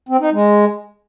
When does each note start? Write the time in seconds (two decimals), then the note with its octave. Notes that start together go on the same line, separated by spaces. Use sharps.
0.09 C4
0.21 D#4
0.33 G#3